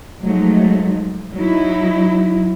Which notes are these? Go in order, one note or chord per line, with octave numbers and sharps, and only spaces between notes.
F3 F#3 G#3 A3 D#4
F#3 D#4 E4